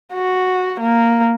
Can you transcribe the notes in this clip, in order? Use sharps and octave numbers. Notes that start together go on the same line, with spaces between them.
F#4
A#3